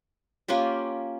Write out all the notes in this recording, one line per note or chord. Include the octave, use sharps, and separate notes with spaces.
A#3 C#4 F4 G4